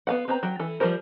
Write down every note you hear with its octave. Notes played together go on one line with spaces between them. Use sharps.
B3 F5 F#5
B3 C4 C5 A5 A#5
F#3 G5
E3 A4
F3 G3 A3 A#4 C5